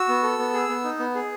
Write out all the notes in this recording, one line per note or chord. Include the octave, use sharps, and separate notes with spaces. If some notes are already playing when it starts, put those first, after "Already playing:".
Already playing: F#4 E6
B3
A4
B3
G#4
B3
D#4
B3
G#4